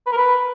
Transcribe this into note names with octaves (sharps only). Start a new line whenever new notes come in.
B4
A#4
B4